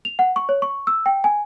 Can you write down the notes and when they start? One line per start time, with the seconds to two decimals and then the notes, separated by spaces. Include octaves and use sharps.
0.05 F7
0.19 F#5
0.36 C#6
0.49 C#5
0.62 C#6
0.87 E6
1.06 G5
1.24 G#5